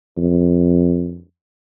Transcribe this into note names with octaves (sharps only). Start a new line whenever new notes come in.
F2